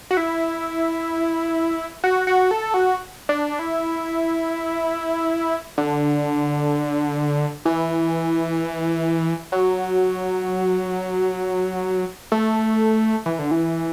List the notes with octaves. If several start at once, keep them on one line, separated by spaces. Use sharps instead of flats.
F#4
E4
F#4
F#4
A4
F#4
D4
E4
D3
E3
F#3
A3
E3
D3
E3